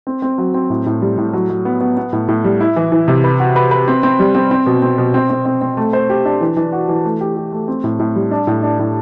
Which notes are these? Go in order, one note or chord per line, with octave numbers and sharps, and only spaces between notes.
C4
C4
F#3
C4
A2
A2
G3
A2
F#3
F#3
B3
B3
B3
A2
A2
G3
E4
E3
E3
C3
B4
F#4
B4
B4
C4
C4
G3
C4
C4
B2
C4
B2
C4
C4
C4
C4
A3
C5
G4
D4
E3
E3
F#4
E3
A3
G4
G4
A3
C4
A2
A2
G3
D4
A2
D4
A2